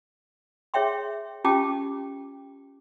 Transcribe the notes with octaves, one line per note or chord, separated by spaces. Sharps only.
G#4 C#5 E5 G5 C6
C#4 F4 G4 G5 A5 D6